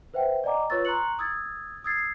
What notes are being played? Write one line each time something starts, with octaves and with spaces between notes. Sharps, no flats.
B4 C5 E5 F#5 G5
D5 D#5 F#5 G#5 A#5 D6
F4 B4 C#5 C#6 E6 A6
A#5 C6 C#6 F#6 C#7 F#7
D#6 E6 G#6 A6
D#6 E6 G#6 A6 C7